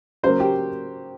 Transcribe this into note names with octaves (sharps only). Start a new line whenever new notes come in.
C#3 F#3 A#3 C5
G4